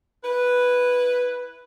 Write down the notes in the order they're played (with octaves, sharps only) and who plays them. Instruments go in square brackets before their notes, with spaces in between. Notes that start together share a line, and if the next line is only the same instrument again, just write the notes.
[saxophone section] E4 B4